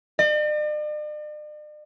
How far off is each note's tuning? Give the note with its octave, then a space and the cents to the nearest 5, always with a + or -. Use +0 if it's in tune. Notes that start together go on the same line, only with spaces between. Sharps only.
D5 +45